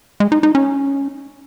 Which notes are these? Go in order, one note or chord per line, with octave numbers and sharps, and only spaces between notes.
G#3
D#4
D#4
C#4